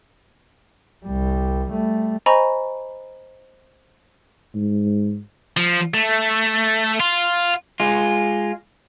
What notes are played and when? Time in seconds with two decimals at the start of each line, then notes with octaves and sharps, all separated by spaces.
1.06 C2 G3
1.72 G3 A3
2.26 C5 D#5 G#5 A#5 B5 C#6
4.55 G#2
5.57 F3
5.94 A3
7.00 F4
7.80 G#3 F4